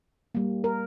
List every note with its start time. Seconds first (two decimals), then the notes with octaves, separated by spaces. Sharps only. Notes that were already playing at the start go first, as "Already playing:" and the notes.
0.35 G3 A#3
0.64 A#4